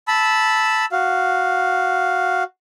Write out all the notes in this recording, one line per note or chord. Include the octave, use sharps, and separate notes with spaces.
A5 B5 E6
F#4 F5